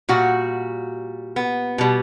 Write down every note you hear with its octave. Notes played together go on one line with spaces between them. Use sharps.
A#2 G3 F#4
B3
B2 G3